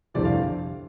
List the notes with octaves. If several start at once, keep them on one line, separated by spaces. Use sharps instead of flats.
G1 F2 C3 E3 D5
F5